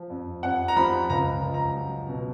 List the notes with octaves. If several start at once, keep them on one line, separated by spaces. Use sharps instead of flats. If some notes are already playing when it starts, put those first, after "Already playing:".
Already playing: F3
F2
F2 F#5
A#5
F3 B5
C#2 A#5
C#2
A#5
F#3
B2